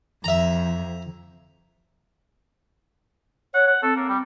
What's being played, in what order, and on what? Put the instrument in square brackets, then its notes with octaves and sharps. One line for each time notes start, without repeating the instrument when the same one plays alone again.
[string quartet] F2 [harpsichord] E5 A#5
[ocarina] C#5 [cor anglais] F#5
[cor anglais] F#5
[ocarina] C4 [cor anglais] A4
[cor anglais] A#3
G3